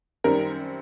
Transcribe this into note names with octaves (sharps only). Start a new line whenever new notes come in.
F#2 D#3 G3 C4 A#4